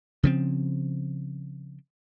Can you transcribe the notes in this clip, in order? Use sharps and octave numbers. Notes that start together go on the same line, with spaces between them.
C#3 F3 C4